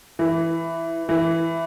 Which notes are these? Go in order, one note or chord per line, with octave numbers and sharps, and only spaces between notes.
E3
E3